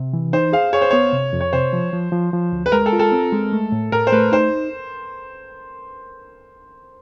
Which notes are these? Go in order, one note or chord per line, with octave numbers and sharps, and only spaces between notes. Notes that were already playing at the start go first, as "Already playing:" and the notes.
Already playing: C3
E3
D#4 C5
G#4 F5
G#4 C#5
C5
B3 C#5
C3
F2
C#5
C3 C5
F3
F3
F3
F3
D2
B4
G#3 A#4
A4
F4
A4
C4
G#3
A3
A2
A2 A#4
C5
A3 B4
D#4 C5